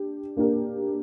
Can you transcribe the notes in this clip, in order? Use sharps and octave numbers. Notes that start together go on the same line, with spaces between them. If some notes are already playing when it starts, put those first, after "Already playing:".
Already playing: D4 G4
A#3 D4 G4 A#4